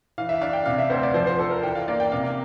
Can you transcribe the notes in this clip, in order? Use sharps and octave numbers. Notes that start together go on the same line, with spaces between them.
E3 F5
E5
D4 F5
G5
C3 F5
E5
D2 C5
D5
F3 C5
C5
D4 A4
A#4
E3 G5
F5
A#3 D5
G5
C3 F5